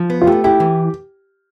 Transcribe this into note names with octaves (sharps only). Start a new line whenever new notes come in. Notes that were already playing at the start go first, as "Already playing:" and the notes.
Already playing: F3
B3
F4
A3 G4
E4 G4
E3